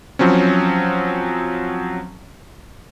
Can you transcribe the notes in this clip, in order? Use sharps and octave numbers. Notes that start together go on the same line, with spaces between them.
F3 F#3 C4 C#4